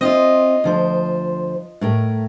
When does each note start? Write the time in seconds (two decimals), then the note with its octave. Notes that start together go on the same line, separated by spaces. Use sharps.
0.01 C4 F4 D#5 E5
0.64 D2 F3 C5
1.81 A2 A3 A#4